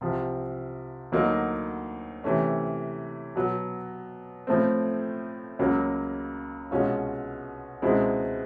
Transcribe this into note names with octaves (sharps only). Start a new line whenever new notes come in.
C2 C3 F3
D2 D3 F#3 A#3 D#4
C3 E3 A3 C#4
B2 F#3 B3
A2 F3 A3 C4
C#2 C#3 F#3 A#3
C2 B2 G#3 C#4 F4
C#2 B2 G#3 C4 E4